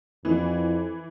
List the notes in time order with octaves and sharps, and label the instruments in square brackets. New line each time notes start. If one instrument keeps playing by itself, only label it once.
[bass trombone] F2 [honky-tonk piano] E3